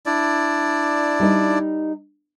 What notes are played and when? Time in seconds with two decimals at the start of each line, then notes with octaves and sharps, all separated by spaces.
0.06 D4 E4 D5
1.20 G3 D#4 D#5